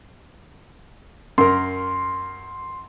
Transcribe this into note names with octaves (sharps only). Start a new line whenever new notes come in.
F#2 A#4 C6